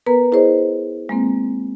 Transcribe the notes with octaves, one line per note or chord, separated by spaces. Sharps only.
B3 A#4 B4 A#5
E4 G#4 A#4 C5 C#5 D#5
G#3 A#3 C4